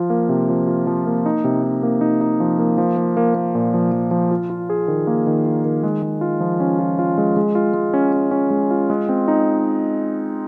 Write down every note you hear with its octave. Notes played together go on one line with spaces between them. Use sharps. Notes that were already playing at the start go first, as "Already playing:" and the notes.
Already playing: F3 F4
A#3
C3
F3
F4
F3
A#3
D#4
C3
D#4
A#3
D#4
D#4
F3
A#3
F3
A#3
A#3
A#3
A#2
F3
F3
F3
F4
F4
G#4
D#3
A#3
D#3
F4
D#3
G#3
G#3
F4
F3
C#4
F4
F4
G#3
G#3
F4
G#3
C#4
C#4
C#4
G#3
F4
G#3
C4
D#4